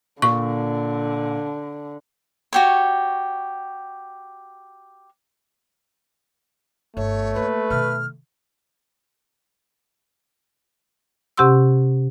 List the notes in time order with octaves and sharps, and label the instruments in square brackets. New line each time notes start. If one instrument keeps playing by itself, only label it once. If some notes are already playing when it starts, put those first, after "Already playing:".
[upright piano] A#2 [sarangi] D3 [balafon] C#6
[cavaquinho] F#4 G4 C#5
[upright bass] G1 [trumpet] A3 [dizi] C#5
[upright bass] A#3 [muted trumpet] B4
[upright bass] B2 D#3 [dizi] F6
[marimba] C3 C#4 G4 F#5 C6 E6